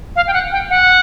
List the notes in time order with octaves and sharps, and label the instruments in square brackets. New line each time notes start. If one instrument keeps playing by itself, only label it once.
[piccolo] F5
G5
F#5
G5
F#5